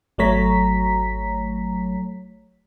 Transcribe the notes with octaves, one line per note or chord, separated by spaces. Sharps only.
G#1 F#3 A3 C#5 A#5 B6